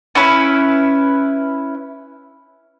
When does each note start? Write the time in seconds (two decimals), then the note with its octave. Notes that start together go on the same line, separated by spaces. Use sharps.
0.15 C#4 E4 B4